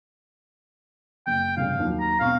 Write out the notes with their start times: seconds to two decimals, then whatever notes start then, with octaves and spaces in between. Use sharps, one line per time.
1.27 F#1 G5
1.57 F1 G2 C#3 F5
1.79 D#2 F#3
2.00 A#5
2.20 E1 C4 F5 C#6